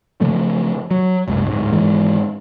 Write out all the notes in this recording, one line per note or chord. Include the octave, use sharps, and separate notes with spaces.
C#3 F3 A3
F#3
F#1 C2 G#3
D1 G#2
G#1 G#2 E3 G#3